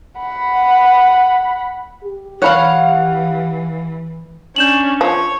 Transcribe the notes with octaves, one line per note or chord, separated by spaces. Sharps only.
F#5 B5
G4
E3 C#5 F5 F#5 B5
C#4 D4 G6 E7 F#7
F3 C#5